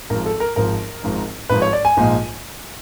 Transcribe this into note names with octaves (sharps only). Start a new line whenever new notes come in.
G#1 G#2 F3 A#4
A4
A#4
G#1 G#2 F3 A#4
G#1 G#2 F3
G#1 G#2 F3 B4
C#5
D5
G#5
A#1 G#2 F3 A#3 D#4